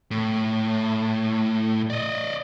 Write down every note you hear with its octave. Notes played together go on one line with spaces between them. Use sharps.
A2
D5 D#5